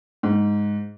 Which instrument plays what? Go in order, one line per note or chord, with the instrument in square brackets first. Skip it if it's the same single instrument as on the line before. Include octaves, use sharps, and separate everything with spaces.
[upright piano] G#2